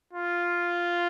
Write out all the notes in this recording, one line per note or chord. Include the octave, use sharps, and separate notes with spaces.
F4